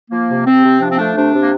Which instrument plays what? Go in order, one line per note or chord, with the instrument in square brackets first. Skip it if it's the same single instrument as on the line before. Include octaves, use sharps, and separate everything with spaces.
[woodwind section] F3 A#3
C3
C3 C4
C3
F3 D4
C4
A3 D4
C3 D4
C3
A#3